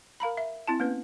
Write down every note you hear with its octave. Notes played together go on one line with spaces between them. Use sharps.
A#4 F5 A#5 B5
E5
C4 E4 A5
A#3 B3 C#4 B4